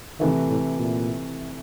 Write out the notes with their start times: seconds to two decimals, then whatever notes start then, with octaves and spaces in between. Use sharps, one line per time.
0.20 C3 D#3 E3 A3
0.49 A2
0.78 A#2